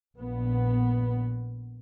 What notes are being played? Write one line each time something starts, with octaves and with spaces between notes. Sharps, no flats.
A#1 B3